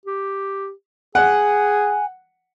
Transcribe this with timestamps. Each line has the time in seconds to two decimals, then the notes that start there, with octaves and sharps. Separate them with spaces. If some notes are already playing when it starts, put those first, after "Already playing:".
0.06 G4
1.15 G#4 F#5 G#5